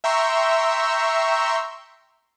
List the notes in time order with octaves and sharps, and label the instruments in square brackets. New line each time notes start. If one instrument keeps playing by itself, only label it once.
[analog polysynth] E5 G5 A#5 C6 C#6 E6